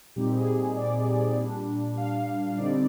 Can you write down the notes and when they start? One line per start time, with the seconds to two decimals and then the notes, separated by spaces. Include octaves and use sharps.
0.16 A#2 G3 C4 D#4 G4
0.36 G#4
0.77 D5
1.37 A#2 G3 D4
1.97 F5
2.57 D3 G3 C4 D#4 D5